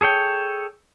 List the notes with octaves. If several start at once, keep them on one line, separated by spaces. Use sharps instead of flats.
G#4 A4 C#5 G5